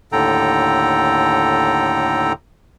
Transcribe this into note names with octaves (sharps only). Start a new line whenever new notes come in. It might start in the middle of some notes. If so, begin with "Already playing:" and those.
D#2 A2 D3 A4 G5 A#5